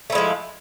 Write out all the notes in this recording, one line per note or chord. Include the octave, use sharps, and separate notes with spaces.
F3 G#3 A3 E4